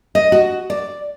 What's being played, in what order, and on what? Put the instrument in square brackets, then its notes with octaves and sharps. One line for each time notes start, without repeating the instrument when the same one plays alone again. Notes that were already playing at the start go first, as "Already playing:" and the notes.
[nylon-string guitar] D#5
F#4
D5